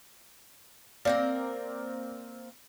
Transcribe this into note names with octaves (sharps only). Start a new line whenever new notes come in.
A#3 C4 A#4 D5